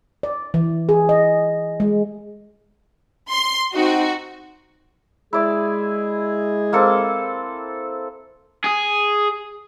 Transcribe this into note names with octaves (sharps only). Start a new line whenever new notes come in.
D5
E3
G#4
D#5
G#3
C6
C4 D#4 F#4
G#3 E4 G#4 D5
A#3 C4 A4
G#4